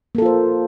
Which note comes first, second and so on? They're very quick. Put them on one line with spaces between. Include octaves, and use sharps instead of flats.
A#3 A4 F4 C5